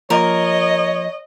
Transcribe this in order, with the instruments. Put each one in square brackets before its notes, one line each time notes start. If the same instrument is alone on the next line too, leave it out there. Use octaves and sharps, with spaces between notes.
[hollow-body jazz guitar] F3 A#3 [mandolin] A#4 [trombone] C#5 [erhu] D#5